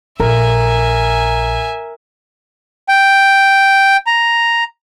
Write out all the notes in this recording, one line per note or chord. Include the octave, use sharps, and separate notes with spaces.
A#1 A#4 E5 G#5
G5
A#5